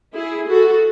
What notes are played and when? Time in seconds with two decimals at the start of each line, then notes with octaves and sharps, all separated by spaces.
0.14 E4 G#4
0.49 F#4 A4